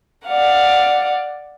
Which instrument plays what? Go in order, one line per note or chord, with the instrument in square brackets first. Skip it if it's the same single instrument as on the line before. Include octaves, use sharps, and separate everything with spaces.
[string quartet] D5 F5 F#5